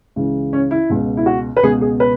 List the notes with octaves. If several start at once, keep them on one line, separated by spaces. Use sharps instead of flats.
C#2 C#3 E3
C#4
E4
C#2 B2
E4
F#4
B4
C#2 B2 G#4
G#4
B4